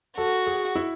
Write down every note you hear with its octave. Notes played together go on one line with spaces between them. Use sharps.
F#4 A4
G#4
E4